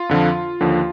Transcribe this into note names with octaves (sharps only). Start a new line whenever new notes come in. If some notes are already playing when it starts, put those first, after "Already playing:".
Already playing: F4
F2 D3 F3
D#2 D3 F3